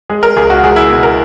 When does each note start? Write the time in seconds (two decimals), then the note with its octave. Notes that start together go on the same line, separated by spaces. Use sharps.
0.10 G#3 G#4
0.23 A#4
0.37 C#2 G#4
0.50 F#4
0.63 C#2 G#4
0.76 E4
0.90 B2
1.03 A#4